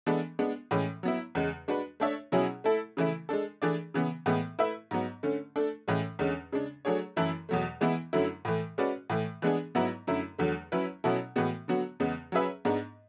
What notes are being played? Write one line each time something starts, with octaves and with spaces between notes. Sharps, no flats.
E3 G#3 B3 D4 A4
G#3 B3 D4
A2 E3 G#3 C#4
F#3 B3 E4
E2 C#3 G#3
G#3 D4 F#4 B4
A3 D4 A4 C#5 E5
B2 F#3 C#4 E4 G#4
A3 E4 A4
C#3 E3 A3 E4
G#3 D4 A4
E3 A3 D4 G#4 D5
C#3 E3 B3
A2 E3 G#3 B3
A3 E4 B4 E5
G#2 F#3 B3
D3 A3 C#4
A3 D4 A4
A2 E3 G#3 C#4
E2 D3 G#3 C#4
C#3 G#3 D4
F#3 A3 D4 G#4 C#5
F#2 E3 A3 E4 A4
E2 B2 F#3 A3
E3 G#3 B3 E4
F#2 D3 F#3 A3 E4
A2 E3 A3
G#3 C#4 F#4 B4 D5
A2 E3 A3
E3 G#3 B3 D4 G#4
G#2 F#3 B3 E4 B4
F#2 D3 A3 E4
E2 D3 F#3 A3
F#3 C#4 E4 B4
B2 F#3 C#4 E4 A4
A2 E3 G#3 B3 F#4
D3 F#3 B3 F#4
E2 C#3 G#3 B3
F#3 C#4 G#4 B4 E5
G#2 G#3 B3 D4